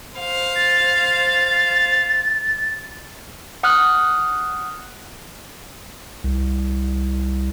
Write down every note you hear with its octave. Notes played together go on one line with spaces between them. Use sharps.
C5 F5
A6
F#5 D#6 F6 F#6
C2